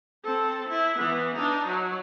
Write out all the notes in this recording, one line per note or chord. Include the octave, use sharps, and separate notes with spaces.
C4 A4
E4
E3 B3
D4 D#4
F#3